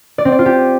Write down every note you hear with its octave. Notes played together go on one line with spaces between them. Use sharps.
D5
C4
D5
F4
G4